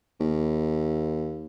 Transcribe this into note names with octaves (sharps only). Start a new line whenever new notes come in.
D#2